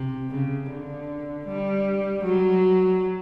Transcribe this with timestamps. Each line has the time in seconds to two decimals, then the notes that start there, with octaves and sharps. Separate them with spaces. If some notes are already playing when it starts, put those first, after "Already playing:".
Already playing: C3
0.31 C#3
0.70 D3
1.48 G3
2.24 F#3